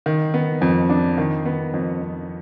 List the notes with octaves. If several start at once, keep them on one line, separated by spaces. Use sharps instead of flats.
D#3
B3
F2
D4
D#3
B3
F2
F2